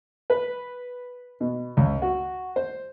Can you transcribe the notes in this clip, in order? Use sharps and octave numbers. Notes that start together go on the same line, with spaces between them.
B4
B2
C#2
F#4
C5